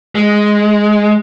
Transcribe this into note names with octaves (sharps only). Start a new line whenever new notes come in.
G#3